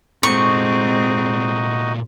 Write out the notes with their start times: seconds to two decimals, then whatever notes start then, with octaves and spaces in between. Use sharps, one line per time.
0.23 A#2 G#3 A3 C4 D#4 F#4 D#5 C#6